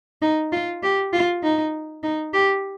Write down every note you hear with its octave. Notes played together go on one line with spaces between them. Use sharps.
D#4
F4
G4
F4
D#4
D#4
G4